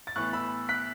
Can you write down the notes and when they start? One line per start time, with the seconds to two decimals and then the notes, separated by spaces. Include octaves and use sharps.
0.07 A6
0.16 A2 E3 B3 C#6 F#6
0.33 B5 E6
0.69 F#6 B6